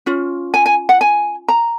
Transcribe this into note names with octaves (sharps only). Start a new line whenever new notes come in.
C#4 F4
G#5
G#5
F#5
G#5
A#5